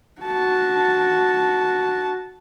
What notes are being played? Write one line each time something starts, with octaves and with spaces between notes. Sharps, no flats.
F#4 A5